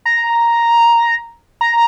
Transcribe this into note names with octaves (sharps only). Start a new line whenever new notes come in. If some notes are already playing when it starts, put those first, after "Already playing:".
A#5
A#5